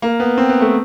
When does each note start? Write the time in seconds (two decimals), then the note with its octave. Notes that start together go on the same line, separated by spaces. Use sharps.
0.02 A#3
0.20 B3
0.37 C4
0.49 B3
0.61 A3